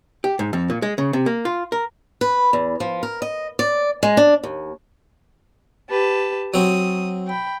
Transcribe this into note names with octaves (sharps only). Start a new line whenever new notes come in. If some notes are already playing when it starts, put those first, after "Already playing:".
G4
G#2
F2
A#2
G#3
C#3
C3
A#3
F4
A#4
B4
E2
F3
A#4
D#5
D5
G#3
D4
D#2
G4 B4 A5
F#3 C4 D#6
G5 B5